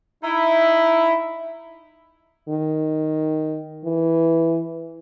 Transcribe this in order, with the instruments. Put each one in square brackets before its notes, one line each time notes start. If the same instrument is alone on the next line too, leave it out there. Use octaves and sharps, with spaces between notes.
[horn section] D#4 E4
[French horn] D#3
E3